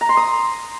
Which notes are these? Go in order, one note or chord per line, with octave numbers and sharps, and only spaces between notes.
A#5
C6
D#6